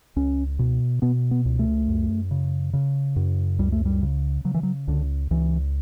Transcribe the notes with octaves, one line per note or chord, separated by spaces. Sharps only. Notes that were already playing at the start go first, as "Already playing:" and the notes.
C#2 C#4
B2
B2 B3
B3
C#2
A3
F#2
C#3
C#3
F#2
C#2 G3
A3
G3
C#3
C#3 F#3
E3
F#3
C#2 D3
C#2 E3